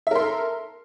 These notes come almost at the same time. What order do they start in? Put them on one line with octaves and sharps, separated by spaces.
E5 A#4 C6 A4